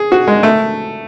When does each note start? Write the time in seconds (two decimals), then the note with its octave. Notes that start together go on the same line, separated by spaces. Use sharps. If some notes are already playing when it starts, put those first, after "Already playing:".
Already playing: G#4
0.12 F#4
0.28 G#3
0.43 A3